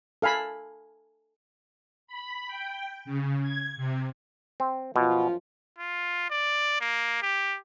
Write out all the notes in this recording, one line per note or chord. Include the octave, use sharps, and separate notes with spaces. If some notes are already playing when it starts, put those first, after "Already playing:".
A4 F5 G#5 B5
B5
G5
C#3
G#6
C3
C4
F#2 B2 F3 F4
F4
D5
A#3
G4